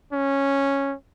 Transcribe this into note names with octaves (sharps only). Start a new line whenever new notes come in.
C#4